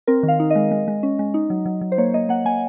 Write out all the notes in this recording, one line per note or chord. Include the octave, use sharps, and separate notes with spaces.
C4 A#4
D#3
F5
D#4
G#3 D#5
G#3
G#3
C#4
G#3
D#4
F#3
F#3
F#3
C5
A#3 C#5
A#3 D#5
A#3 F#5
A#3 G#5